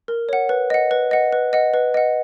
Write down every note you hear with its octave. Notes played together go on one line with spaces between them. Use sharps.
A#4
C#5 F#5
B4
D#5 F#5
B4
D#5 F#5
B4
D#5 F#5
B4
D#5 F#5